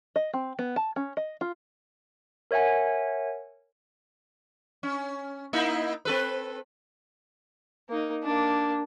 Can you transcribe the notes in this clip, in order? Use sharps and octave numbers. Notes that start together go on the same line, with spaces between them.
D#5
C4
B3
A5
C#4
D#5
F4
A#4 C#5 E5 F#5 G#5
C#4
A#3 D#4 E4
C4 A4 B4
A#3 D#4
A#3 D4